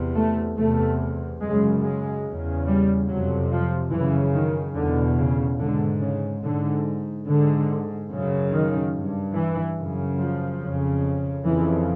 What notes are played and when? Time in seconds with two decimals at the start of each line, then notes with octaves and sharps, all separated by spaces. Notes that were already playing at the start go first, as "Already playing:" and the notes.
Already playing: E2 C3
0.15 A3
0.57 E2 C3 A3
1.41 F#2 C#3 G#3
1.83 G#3
2.25 E2 C#3
2.67 G3
3.08 F2 C3 F#3
3.51 F3
3.92 F#2 C#3 E3
4.34 D#3
4.75 E2 B2 D3
5.18 C#3
5.59 G#2 D3
6.01 C#3
6.43 G#2 D3
7.27 G#2 D3
8.11 F#2 C#3
8.52 D#3
8.94 G2
9.35 E3
9.78 F#2 C#3
10.19 F3
10.61 F2 C#3
11.45 F2 C#3 E3